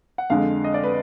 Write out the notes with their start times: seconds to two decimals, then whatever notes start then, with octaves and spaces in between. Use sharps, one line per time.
0.18 F#5
0.30 F2 D3 G#3 F5
0.64 D#5
0.74 D5
0.84 B4